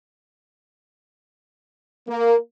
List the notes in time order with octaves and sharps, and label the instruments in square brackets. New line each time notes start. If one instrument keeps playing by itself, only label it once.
[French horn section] A#3